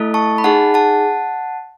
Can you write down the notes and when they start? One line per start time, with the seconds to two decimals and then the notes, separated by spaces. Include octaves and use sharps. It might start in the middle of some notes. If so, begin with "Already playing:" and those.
Already playing: A3 E4 A4
0.14 A5 C#6
0.38 B5
0.44 D#4 G#4 F#5 A5
0.74 F#5 A5